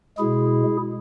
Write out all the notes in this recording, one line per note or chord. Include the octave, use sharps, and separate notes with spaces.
B2 G#3 E4 G#4